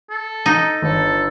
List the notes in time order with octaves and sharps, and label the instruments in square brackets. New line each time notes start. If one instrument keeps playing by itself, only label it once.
[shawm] A4
[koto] D#4
[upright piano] G1 [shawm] A4